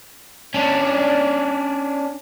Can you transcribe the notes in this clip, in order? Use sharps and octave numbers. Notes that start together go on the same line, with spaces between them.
C#4 D4